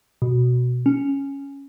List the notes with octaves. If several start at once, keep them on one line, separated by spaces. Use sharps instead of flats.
B2
C#4